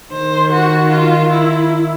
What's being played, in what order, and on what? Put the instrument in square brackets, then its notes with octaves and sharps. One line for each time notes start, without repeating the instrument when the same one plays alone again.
[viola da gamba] D#3 [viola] C5
[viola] F#4
F4
E4